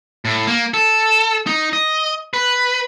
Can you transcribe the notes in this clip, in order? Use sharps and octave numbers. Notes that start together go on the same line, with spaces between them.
A2
A#3
A4
D#4
D#5
B4